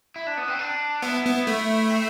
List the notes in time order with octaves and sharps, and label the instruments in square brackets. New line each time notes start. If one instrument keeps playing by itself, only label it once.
[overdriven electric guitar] E4
D4
B3
C4
D4
[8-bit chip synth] B3 [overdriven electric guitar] E4
[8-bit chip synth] B3
A3
[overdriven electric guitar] C4